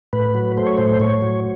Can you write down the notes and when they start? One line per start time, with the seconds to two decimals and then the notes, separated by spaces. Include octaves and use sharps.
0.13 A2 B4
0.35 F#3
0.57 A3 C5
0.67 C#5
0.77 A2 C5
1.00 A2 C#5
1.22 F#3